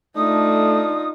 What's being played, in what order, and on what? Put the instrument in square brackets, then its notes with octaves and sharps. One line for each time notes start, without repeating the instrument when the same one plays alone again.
[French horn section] A3 [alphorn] D4 [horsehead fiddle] D#4 F4 [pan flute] D#6